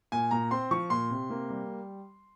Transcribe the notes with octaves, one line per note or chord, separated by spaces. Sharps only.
A#2 G#5
A#2 A#5
C4 C6
F3 C#6
A#2 C6
C3
A#3
G3